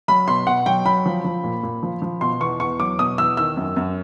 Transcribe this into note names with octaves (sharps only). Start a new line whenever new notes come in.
F#3 B5
B2 C6
B2 F#5
F#3 G5
F#3 B5
F3
F3
A#2
A#2
F3
F3
B2 C6
E2 C#6
E2 C#6
F#3 D6
B2 D#6
E2 E6
D#3 E6
F#2
F#2